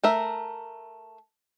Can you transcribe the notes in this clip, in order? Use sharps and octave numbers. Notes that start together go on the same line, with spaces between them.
A3 A#4 E5